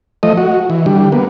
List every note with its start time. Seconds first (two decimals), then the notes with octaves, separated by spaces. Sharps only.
0.23 F3 A3 D#5
0.37 F#4
0.70 E3
0.86 D3 G3
1.12 A#3 B3